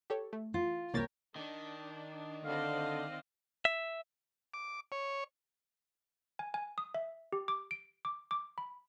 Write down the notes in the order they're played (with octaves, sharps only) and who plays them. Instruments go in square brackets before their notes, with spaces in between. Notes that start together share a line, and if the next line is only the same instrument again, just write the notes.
[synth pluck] G4 A4 C#5
A3
[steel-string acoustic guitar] F4
[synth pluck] C2 A#3 A6 [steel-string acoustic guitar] G4 A#4 C#5
[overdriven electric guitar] D#3 [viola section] D4
[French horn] D3 [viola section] C4 D5 D#5 [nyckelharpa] F5
[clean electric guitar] E5
[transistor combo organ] D6
C#5
[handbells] G#5
G#5
D#6
E5
G4
D6
D7
D6
D6
B5